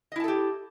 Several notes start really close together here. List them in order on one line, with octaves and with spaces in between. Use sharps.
D#5 E4 A5 A4 G4